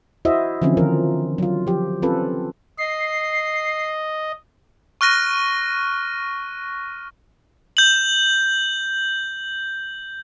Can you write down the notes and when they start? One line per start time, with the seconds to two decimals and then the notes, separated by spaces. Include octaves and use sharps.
0.25 E4 F#4 C5 D#5 E5
0.62 D3 E3 F3 C4 C#4
0.77 D#3 F3 F4 A#4
1.38 F#3 F4
1.67 F3 G4
2.02 C4 C#4 F4 A4 B4
2.78 D#5 C7
5.01 C#6 F6 F#6 A#6 D#7
7.77 G6 F#7